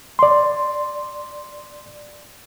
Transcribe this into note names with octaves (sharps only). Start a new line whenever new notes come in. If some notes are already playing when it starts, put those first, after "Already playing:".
D5 C6